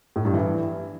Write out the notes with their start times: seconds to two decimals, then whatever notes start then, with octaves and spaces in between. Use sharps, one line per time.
0.16 A2
0.25 G2
0.34 E3